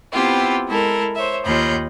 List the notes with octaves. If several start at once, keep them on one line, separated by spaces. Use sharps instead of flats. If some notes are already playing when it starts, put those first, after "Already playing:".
B3 C4 E4 F4 G4
G#3 E4 A4 A#4
C5 C#5 E5
D#2 F4 C#5 D#5 B5 G6